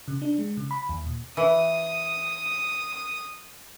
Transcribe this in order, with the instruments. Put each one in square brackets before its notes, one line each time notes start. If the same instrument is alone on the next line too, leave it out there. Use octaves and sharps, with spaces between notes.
[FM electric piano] C#3
D4
G#3
C#3
B5
D#2
A#2
[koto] E3 [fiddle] D#6